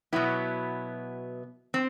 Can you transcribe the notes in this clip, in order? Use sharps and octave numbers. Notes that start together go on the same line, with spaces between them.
B2 F#3 B3 E4
C4